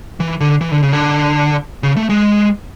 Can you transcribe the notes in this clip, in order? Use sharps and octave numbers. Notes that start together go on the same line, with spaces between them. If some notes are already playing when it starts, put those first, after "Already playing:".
E3
D3
E3
D3
C#3
D3
C#3
A3
G#3